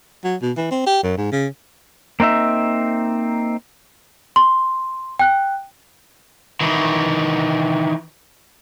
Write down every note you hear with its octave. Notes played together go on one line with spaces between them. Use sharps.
F#3
B2
E3
C4
G4
F#2
G#2
C#3
A#3 C4 D#4 E5
C6
G5 F#6
D#3 E3